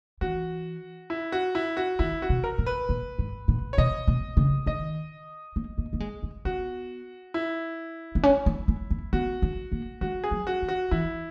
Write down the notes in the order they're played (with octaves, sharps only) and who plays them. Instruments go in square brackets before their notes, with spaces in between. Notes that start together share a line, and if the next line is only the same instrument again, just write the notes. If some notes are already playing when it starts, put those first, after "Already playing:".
[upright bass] E3 [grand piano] F#4
[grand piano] E4
F#4
E4
F#4
[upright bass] D#3 [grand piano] E4
[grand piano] F#4
[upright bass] B2
[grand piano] A#4
[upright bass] A#2
[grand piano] B4
[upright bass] A#2
G#2
A#2
[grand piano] C#5
[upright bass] B2 [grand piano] D#5
[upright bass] B2
C#3
[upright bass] D#3 [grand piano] D#5
[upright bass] A#3
A#3
A#3
G#3
G#3
[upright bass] B3 [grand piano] F#4
[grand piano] E4
[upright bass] B3
C#4
B3
B3
B3
[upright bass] B3 [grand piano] F#4
[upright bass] C#4
A#3
[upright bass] G#3 [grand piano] F#4
[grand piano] G#4
[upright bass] F#3
[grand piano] F#4
[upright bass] E3
[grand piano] F#4
[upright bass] E3 [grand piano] E4